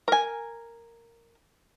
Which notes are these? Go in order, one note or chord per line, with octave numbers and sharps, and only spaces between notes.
A#4 G#5